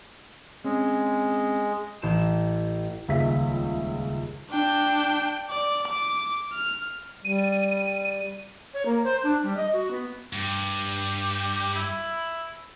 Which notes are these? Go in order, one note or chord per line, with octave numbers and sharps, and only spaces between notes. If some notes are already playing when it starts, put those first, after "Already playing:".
G#3 C4 C#4
A1 C5 E7
D#1 C#2 G#3 E5 B6
D4 G5
D5
D6
F6
G3 D#7
C#5
A#3
C5
D4
G3
D#5
F#4
B3
G2 G4
E4